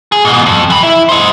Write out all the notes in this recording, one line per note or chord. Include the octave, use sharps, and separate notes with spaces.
G#4
G#2 B2
F2
E3 B5
E4
C5 D#5